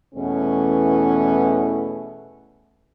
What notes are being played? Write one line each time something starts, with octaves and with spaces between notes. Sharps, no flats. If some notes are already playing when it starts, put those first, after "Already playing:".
E2 B2 E3 A3 C#4